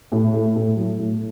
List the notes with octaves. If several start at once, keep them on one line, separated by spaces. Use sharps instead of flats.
A2
A3
A2
F#3
A2